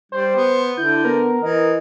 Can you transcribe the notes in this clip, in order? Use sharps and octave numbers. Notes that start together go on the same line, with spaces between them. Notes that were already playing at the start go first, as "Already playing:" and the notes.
G3 C5
B3
D3 E4 G6
B3 A#4
E3 D#5